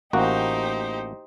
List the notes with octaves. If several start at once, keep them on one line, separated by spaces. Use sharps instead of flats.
A1 A#3 D#4 F#4 G4 C5